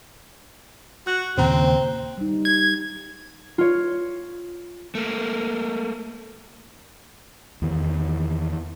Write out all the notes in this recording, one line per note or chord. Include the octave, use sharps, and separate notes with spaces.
F#4 F#6
D#2 A#2 C#3 C4 C5 A#5
G3 D#4
G#6
F4 C#5
A3 A#3
E2 D#3 E3